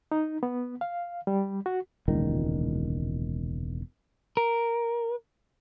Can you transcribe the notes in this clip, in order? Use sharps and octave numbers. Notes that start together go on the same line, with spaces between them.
D#4
B3
F5
G3
F#4
E1 C#2 A#2 D#3
A#4